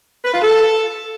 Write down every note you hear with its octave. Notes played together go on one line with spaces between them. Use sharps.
B4
F4
A4